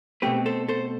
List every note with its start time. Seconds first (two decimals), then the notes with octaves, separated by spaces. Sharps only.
0.22 B2 A3 C4 G4 B4
0.46 A4 C5
0.69 A4 C5